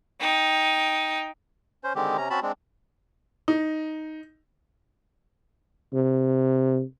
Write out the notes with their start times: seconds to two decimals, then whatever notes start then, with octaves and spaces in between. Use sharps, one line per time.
0.20 D#4 G5
1.84 C#4 C5
1.96 D3 D#3 G#3 C4 G4
2.18 C3 C#4 A#5
2.30 C4 C#4 F#4 A5 B5
2.42 G#3 C4 D4
3.48 D#4
5.93 C3